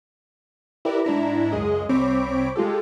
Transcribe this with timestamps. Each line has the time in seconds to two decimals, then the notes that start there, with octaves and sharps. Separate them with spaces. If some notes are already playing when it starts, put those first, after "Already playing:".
0.85 E4 G4 A#4 B4 D5
1.05 G#2 D4 E4 A#5
1.52 C#2 F#2 G#3 G#4 D#5
1.89 C2 C4 C#5 B5 D6
2.56 G#3 F4 G4 A4